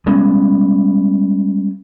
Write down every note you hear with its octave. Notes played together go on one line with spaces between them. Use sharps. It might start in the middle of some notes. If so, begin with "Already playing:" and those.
G3 G#3 B3 C#4